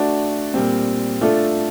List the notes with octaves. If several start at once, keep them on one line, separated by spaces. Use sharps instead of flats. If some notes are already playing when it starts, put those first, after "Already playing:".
Already playing: A3 D4 F#4
A#2 G3 C4
A3 D4 F4 A4